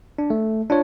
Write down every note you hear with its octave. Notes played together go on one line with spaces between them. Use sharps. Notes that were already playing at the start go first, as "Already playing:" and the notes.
D4
A3
D4 F4 C#5